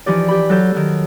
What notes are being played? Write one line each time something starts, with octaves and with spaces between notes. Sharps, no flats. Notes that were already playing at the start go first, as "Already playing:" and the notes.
E3 F3 D#4 G4 D5
G4 B5
F#3 A4 G6
D#3 F#3